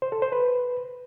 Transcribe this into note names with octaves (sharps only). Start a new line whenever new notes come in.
C5
A4
C5
B4